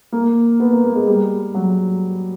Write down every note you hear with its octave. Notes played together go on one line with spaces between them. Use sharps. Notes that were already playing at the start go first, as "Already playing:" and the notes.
A#3
B3
A#3
A#3
G#3
G3
F#3